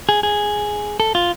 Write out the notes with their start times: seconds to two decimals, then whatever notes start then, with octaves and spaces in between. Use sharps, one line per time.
0.09 G#4
0.23 G#4
1.00 A4
1.15 F4